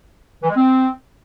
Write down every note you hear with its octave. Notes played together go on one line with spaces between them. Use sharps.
E3
G#3
C4